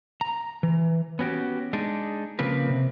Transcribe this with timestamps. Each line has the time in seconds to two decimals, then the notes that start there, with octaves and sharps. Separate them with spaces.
0.21 A#5
0.63 E3
1.19 B3 C#4 F#4 G4
1.73 G#3 D4 D#4
2.39 C#3 F3 A#3 C4 B4
2.69 C3